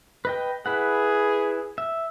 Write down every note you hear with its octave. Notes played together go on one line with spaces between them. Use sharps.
B4 D#5 G5
E4 G#4 B4 F#5
E5